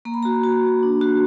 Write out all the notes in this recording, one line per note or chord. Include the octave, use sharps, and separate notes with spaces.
A#3 A#5
B5
F#4 A#5
F#4
A#3
D4
F#4